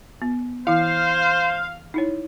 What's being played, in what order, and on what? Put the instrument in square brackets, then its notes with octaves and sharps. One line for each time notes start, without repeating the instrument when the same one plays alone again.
[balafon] B3
[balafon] E3 E4 [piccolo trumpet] C5 [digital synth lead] F5
[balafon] D#4 E4 C#5